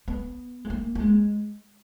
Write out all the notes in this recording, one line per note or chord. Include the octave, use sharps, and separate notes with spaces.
B3
G#3
A#3
A#3
G#3